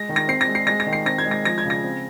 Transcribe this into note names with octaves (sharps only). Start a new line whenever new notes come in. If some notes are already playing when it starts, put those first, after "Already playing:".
Already playing: G#3 A#6
D#3
A#6
C4 C7
A#6
G#3
C7
G#3 A#6
A#6
D#3
C7
C4 A#6
G#6
G#3
A#6
F3 A#6
G#6
C#3
A#6
C4